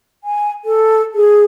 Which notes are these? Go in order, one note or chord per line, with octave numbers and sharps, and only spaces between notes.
G#5
A4
G#4